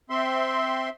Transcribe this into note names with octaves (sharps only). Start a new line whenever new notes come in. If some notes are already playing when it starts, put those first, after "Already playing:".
C4 E5 C6